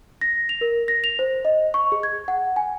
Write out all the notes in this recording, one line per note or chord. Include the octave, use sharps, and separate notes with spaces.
A#6
F7
A#4
A#6
F7
C5
D#5
C#6
G#4
G#6
F#5
G#5